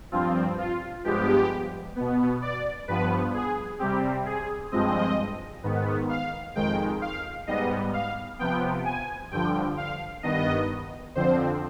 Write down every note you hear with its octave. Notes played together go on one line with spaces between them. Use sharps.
G2 F3 C4 F4
F4
G2 F3 G#3 B3 G4
B2 B3
D5
G2 F3 B3 B4
G#4
C3 G3 C4 G4
G#4
G2 F3 G#3 C4 D#5
G#2 D#3 B3
F5
F2 D#3 G#3 G5
F5
G#2 G3 B3 D#5
F5
C3 F3 B3 G5
G#5
G2 D3 F3 G5
F5
G2 D#3 B3 D#5
F2 D3 F3 C4 C5